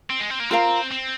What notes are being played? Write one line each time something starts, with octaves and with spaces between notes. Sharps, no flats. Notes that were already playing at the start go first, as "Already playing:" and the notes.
C4
G#3
C4
A#3
C4 F4 A#4 F5 A#5
C4